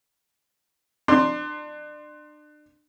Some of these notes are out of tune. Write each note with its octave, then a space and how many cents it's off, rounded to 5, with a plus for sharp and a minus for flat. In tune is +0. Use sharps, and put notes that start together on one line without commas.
D4 +35 C6 +0